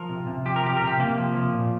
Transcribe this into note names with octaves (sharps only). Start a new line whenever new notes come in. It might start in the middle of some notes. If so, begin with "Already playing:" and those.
Already playing: F3 A#4
C3
C3
F3 G4
A#4
F3 G4
C3 A#4
G4
C3 A#3
F3
F3
A#2